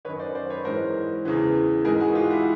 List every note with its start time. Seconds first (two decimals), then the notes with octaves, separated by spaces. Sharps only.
0.05 D#3 B4 C#5
0.08 F#2
0.19 C5 D5
0.35 C5 D5
0.50 B4 C#5
0.65 G#2 E3 A#4 C5
1.25 E2 C#3 E3
1.85 G#2 E3 G#4 A#4
2.00 F#4 G#4
2.15 F4 G4
2.30 E4 F#4